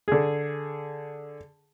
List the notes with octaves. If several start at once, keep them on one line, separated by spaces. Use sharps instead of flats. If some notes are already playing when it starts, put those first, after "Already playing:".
D3 G#4